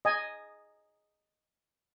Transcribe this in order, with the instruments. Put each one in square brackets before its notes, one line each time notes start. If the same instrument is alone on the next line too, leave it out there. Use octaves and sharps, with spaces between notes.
[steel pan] D#5 G#5